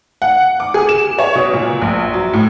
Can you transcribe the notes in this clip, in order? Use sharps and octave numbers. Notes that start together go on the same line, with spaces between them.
F#5
D6
G#4
E7
C#5
B2
A#2
A#1
F#3
A2